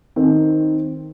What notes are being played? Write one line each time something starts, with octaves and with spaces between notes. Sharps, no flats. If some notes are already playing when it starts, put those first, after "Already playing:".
D#3 C4